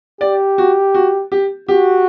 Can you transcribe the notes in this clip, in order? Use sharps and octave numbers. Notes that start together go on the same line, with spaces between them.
G4 D5
F#4
F#4
G4
F#4 G4